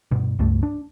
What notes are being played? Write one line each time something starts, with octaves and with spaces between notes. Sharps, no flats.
G2 B2
C#2 G2 A3
D4